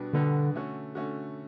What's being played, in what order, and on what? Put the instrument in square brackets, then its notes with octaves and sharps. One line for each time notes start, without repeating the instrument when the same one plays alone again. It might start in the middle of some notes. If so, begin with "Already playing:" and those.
Already playing: [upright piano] B2 G3 B3 D4 F#4
[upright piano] B2 G3 B3 D4 F#4 [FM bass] D3
[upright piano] D3 A3 C#4 F#4
D3 A3 C#4 F#4